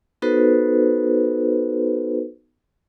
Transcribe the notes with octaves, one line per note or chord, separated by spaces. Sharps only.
B3 D#4 F#4 A4 B4 C5